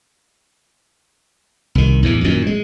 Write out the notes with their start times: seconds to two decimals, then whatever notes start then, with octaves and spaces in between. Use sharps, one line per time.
1.75 C2 D#3
2.03 E2 A2 E3
2.24 F#2 A#2 D#3
2.47 G#3